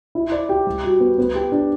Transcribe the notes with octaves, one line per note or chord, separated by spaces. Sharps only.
E4
D5
G4
G3
F#4
B3
B3
G4
D4